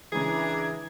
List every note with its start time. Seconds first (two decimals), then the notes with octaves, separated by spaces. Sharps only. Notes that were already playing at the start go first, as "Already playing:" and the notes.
0.12 C#3 E3 G#3 D4 G#4 A#5 G#6